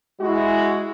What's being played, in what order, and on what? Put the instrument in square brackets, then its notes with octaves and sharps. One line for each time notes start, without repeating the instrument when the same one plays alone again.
[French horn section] G#3 E4 F#4